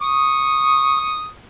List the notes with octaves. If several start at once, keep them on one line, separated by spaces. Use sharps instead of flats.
C#6 D#6